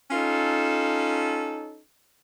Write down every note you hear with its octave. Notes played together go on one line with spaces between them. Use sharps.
C#4 D#4 F4 A4